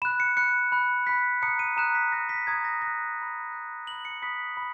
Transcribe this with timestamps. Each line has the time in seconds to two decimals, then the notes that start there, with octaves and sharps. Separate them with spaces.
0.02 B5 F#6 E7
0.20 C#7
0.37 B5 F#6 C#7
0.72 B5 F#6
1.07 B5 F#6 B6
1.42 A#5 D#6 F#6 C#7
1.59 D#7
1.77 A#5 D#6 F#6 E7
1.95 B6
2.12 A#5 D#6 F#6 A#6
2.29 B6
2.47 A#5 D#6 F#6 G#6
2.64 A#6
2.82 B5 F#6 A#6
3.18 B5 F#6
3.52 B5 F#6
3.87 B5 F#6 F#7
4.05 C#7
4.22 B5 D#6 F#6 B6
4.57 B5